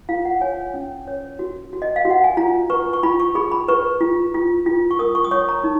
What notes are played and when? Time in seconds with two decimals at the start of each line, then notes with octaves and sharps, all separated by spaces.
0.09 F4 F5
0.25 F#5
0.41 C#5 G#5
0.74 C#4
1.07 C#5
1.39 F#4
1.73 F#4
1.82 D#5
1.96 F5
2.05 F#4
2.10 F#5
2.24 G#5
2.37 F4 A#5
2.70 B4 C#6
2.93 C#6
3.03 F4 B5
3.20 C#6
3.35 G#4 B5
3.52 B5
3.68 B4 C#6
4.01 F4
4.34 F4
4.66 F4
4.91 C#6
4.99 A#4 D#6
5.15 C#6
5.24 D#6
5.31 C#5 C#6
5.49 A#5
5.64 D#4